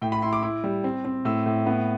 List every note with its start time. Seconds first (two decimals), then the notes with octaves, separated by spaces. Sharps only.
0.02 A2 G5
0.12 B5
0.22 E4 C6
0.33 D6
0.43 E4 D6
0.64 G3
0.84 C4
1.05 C4
1.25 A2 E6
1.46 A2
1.66 B3